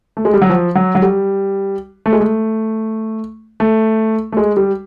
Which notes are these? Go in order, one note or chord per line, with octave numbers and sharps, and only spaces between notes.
A3
G#3
G3
F#3
F3
F#3
F#3
G3
A3
G#3
A3
A3
A3
G#3
G3